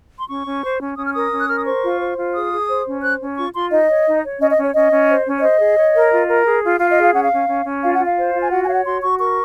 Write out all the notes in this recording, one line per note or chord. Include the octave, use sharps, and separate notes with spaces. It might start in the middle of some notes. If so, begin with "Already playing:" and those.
C6
C#4 C#6
C#4
C5
C#4
C#4 D#6
F6
A#4 D#6
C#4
F#6
A#4 F6
D#6
C5 C#6
F4
C5
F4
G#4 D#6
G#4
C5
C#4
C5 F#6
C#4
F4 C#6
F4 C6
D#4 D#5
C#5
D#4
C#5
C#4 D#5
D#5
C#4
C#5
C#4 D#5
C#4
C5
C#4
C#5
C5 D#5
G#4
C#5
A#4
F4
A#4
G#4
F4
F4 F5
D#5
G#4
F5
C#4 F#5
F5
C#4
C#4
C#4
F4 F5
F#5
F4
F5
C5
F4
G#5
F#4 F#5
G#5
C#5 F5
F#5
F#4 C6
F#4 C#6
A#4 C#6